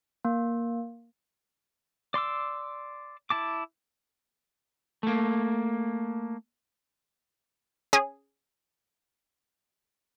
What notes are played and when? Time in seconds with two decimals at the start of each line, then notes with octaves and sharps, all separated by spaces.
0.25 A#3
2.14 D5 C6 D6 E6
3.30 E4 A5 D6
5.03 A3 A#3
7.93 C#4 G#4